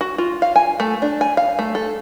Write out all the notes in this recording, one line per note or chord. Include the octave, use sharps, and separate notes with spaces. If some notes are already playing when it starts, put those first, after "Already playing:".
F#4
F4
F5
G#5
A3
D4
G#5
F5
A3
A4